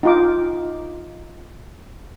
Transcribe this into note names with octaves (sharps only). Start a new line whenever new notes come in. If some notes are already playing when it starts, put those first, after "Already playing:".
D#4 F4 D6